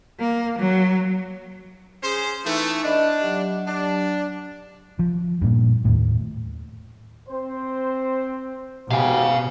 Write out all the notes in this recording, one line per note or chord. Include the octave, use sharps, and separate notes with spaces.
A#3
F#3
C#4 G#4 C5
E3 A3 D#4
D4 D#5 E5 B5
F#3 G4
D4
F3
G2 A#2
D#2 A2
C4 C5
G#2 B2 B3 G4 F5 G#5